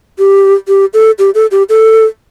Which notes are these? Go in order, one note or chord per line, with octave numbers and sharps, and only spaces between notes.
G4
G4
A4
G4
A4
G4
A4